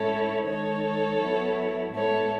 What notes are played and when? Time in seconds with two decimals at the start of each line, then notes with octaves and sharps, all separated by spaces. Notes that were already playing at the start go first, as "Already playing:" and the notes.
Already playing: A2 G#3 C#4 E4 A4 C#5
0.46 D#3 G#3 D#4 A4 C#5
1.20 F#3 B3 E4
1.94 A2 G#3 B3 E4 A4 C#5